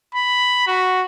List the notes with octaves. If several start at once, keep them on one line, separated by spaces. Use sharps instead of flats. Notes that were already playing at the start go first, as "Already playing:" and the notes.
B5
F#4